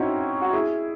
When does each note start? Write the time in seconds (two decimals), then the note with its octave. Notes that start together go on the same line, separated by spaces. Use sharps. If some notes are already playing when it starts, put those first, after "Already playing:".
Already playing: C4 C#4 D#4 E4 F#4
0.41 F#4
0.53 E4 G#4